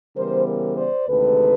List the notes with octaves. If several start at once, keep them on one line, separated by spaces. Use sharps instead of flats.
C#3 E3 G3 B3 A#4 C5
A#4 C5
C5 D5
D2 C3 D#3 G#3 A4 B4